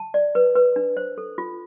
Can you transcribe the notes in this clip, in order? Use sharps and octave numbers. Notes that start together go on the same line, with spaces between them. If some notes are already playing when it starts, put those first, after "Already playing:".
Already playing: A5
D5
B4
B4
D4
C5
A4
F4